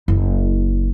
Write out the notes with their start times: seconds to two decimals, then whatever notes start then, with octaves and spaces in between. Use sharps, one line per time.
0.08 F#1 E4